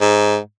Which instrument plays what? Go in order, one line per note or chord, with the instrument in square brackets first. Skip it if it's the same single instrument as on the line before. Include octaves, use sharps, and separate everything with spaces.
[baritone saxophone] G#2